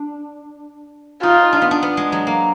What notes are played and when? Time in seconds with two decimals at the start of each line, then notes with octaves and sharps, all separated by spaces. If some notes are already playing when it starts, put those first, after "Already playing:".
Already playing: D4
1.23 D#4 F4
1.53 D4
1.62 B3
1.71 D4
1.83 B3
1.97 G#3
2.12 F#3
2.27 A#3